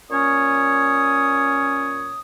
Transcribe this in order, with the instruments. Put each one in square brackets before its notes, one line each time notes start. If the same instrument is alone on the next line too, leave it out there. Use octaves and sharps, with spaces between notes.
[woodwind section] A#2 C#4 C#5 D#6